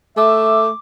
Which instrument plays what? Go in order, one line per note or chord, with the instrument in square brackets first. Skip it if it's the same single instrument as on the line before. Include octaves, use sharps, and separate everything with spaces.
[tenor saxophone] A3 [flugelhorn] E5 [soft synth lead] D6